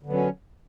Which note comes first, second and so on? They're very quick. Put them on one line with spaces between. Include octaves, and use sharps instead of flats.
D3 B3 F#3 C#4